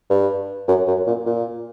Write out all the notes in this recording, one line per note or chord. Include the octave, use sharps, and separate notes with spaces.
G2
F#2
F#2
A#2
A#2